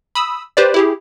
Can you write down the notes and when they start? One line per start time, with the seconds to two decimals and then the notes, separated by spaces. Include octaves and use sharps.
0.15 B5 D#6 E6
0.57 G4 B4 C5 D5
0.74 E4 G4 G#4